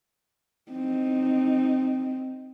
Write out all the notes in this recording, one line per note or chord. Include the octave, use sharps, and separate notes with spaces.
C4 D#4